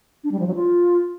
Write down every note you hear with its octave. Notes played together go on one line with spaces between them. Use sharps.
D4
G3
F3
F#3
F4